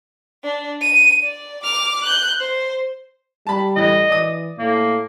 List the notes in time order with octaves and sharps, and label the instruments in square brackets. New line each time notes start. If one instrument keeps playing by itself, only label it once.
[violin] D4
D#7
D5
D6 F6
F#6 G6
C5
[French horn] G3 [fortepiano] A5 B5
[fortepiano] A2 E3 [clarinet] D#5
[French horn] E3 [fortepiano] D5 D#6
[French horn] A2 [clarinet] A#3